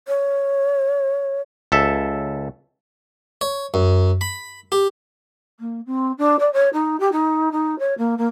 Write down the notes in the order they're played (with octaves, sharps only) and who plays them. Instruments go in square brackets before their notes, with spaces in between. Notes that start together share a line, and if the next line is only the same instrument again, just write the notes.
[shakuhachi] C#5
[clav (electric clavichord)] C#2 A4 E5
[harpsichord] C#5
F#2
B5
G4
[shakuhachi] A#3
C4
D4
D5
C#5
D#4
G4
D#4
D#4
C#5
A#3
A#3